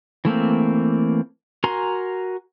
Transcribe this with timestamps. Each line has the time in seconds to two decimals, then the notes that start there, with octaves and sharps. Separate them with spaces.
0.25 E3 A3 A#3 C4
1.64 F#4 A#4 G#5 A#5 C6